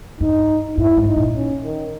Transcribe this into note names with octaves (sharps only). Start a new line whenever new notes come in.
G2 D#4
G#2 E4
G#2
D#4
A#2
C#4
D#3